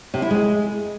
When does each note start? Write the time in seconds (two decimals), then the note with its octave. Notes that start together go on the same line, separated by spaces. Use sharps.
0.14 C3
0.22 E4
0.31 G#3